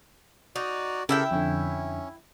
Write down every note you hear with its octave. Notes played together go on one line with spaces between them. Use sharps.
D#4 F#4 D5
C#3 E4 G4 A4 A#4 E5 G5
F2 D3 C#4